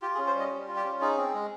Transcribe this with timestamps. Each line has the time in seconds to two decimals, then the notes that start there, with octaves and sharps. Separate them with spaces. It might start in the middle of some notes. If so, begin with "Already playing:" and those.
0.02 F4 G4
0.15 G#4
0.18 C#4
0.27 C5
0.35 G3 D#5
0.51 G3
0.68 F4
0.76 G4
0.84 C#4
1.01 D#4 G#4
1.18 C4
1.34 G#3